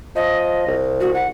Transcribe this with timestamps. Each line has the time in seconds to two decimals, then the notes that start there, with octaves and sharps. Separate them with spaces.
0.16 F3 D#5
0.67 C2
1.00 F#4
1.14 F#5